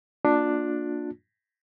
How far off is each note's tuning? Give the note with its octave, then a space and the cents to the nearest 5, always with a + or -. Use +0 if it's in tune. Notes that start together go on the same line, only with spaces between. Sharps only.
A#3 +0 D4 +5 F4 +35